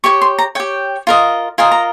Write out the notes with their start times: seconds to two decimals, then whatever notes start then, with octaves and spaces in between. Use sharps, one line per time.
0.04 G4 C#5 C#6
0.22 C6
0.39 A#5
0.55 G4 C#5 G5
1.07 F4 A#4 D#5
1.58 F4 A#4 D#5 G#5
1.71 A#5